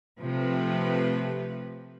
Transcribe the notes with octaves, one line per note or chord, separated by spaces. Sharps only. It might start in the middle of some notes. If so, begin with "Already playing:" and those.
C3 F3 A3 B4